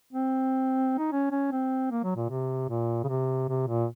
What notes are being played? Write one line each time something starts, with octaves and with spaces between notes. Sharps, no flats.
C4
D#4
C#4
C#4
C4
A#3
F#3
A#2
C3
A#2
C#3
C3
C3
A#2